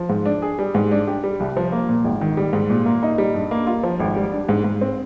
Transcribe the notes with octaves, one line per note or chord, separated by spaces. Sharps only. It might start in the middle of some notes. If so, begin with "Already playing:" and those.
Already playing: F3
G#2
D4
G#4
G3
G#2
D4
G4
G3
C2
F3
A#3
A#2
G#1
D#3
G3
G#2
A#2
A#3
D#4
G3
G2
A#3
F4
F3
G#1
G3
D4
G#2
G#2
C4